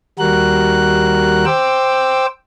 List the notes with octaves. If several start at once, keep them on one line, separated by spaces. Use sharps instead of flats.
D#2 G3 F#4 A#4 F#6
C5 G5 D6 E6